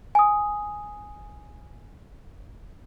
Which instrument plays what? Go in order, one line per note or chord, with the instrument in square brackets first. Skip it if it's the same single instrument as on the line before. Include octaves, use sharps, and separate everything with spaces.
[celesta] G#5 D#6